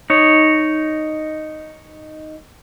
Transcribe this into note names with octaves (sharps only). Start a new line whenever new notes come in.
D#4 C#5